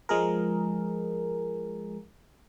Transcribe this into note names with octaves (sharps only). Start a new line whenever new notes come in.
F3 G#3 G#4 A#4